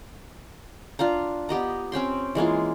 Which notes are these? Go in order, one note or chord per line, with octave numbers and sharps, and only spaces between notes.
D4 F4 F5 A#5
B3 G4 D#5 A#5
C4 C#4 G5 C6
E3 G#3 A#3 F4